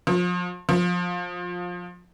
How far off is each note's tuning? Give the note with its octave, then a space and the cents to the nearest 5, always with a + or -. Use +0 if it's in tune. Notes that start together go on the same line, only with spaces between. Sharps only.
F3 +30
F3 +20